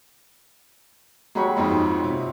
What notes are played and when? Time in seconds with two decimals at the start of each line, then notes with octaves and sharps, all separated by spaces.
1.35 F#3 G#3 G4 B5 C#6
1.57 F2 G#2 D#4 F4
2.04 C3